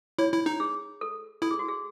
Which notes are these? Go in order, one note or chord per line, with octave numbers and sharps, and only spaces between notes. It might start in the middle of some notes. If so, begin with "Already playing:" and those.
E4 C#5
E4
D#4
G#4
A4
E4 A4
G#4
F#4
G#4